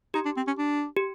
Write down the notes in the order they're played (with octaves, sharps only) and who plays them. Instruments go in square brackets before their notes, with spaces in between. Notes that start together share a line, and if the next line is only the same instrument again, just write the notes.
[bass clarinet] D#4 [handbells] G4
[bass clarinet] D4
C4
C#4
D4
[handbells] G4